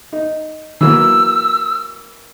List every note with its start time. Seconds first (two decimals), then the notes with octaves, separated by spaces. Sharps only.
0.13 D#4
0.81 E3 F#3 A#3 E6